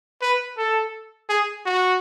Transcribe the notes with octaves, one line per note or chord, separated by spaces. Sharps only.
B4
A4
G#4
F#4